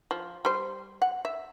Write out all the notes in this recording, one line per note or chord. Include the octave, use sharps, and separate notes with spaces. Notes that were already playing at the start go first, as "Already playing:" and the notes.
F3
G3 C5
F#5
E5